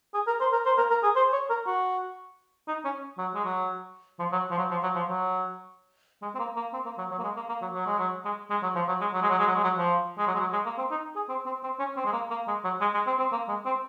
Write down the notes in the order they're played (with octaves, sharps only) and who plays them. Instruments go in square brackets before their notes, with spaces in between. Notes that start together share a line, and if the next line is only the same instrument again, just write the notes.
[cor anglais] G#4
A#4
C5
A#4
C5
A#4
A#4
G#4
C5
C#5
A#4
F#4
D#4
C#4
F#3
G#3
F#3
F3
F#3
F3
F#3
F3
F#3
F3
F#3
G#3
C4
A#3
A#3
C4
A#3
F#3
F#3
A#3
G#3
A#3
A#3
F#3
F#3
G#3
F#3
G#3
G#3
F#3
F3
F#3
G#3
F#3
G#3
F#3
G#3
F#3
G#3
F#3
F3
G#3
F#3
G#3
F#3
G#3
A#3
C4
D#4
G#4
C4
C4
C4
C#4
C4
G#3
A#3
A#3
G#3
F#3
G#3
G#3
C4
C4
A#3
G#3
C4